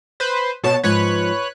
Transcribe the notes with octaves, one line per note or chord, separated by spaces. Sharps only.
B4 C5
B2 B3 C#5 A5
G#2 F3 B4 C#5 F#6